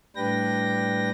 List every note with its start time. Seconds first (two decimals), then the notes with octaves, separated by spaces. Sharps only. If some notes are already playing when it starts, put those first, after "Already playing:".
0.16 A2 G3 D4 B4 G5 A#6